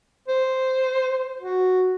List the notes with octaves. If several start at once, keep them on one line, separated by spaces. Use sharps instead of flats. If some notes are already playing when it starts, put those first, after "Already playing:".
C5
F#4